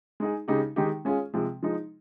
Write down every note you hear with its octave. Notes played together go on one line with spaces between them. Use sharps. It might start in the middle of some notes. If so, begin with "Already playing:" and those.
G#3 D#4 G#4
C#3 G#3 D#4 G4
D#3 G#3 D#4 G4
G#3 C#4 F4 G#4
C3 F3 G#3
F3 G#3 D#4